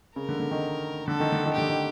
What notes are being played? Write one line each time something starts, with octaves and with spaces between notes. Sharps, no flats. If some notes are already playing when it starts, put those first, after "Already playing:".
C#3 A#4
D3
D3
D#3
D3 A4
D#3
D3
D#3
D3 G4
D#3